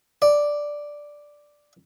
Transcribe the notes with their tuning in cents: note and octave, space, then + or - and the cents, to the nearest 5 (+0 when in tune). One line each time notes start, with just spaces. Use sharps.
D5 +0